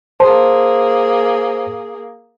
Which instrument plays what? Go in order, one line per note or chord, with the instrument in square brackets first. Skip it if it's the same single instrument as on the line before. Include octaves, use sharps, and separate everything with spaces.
[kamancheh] A#3 G#4 [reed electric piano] C5 [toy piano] A5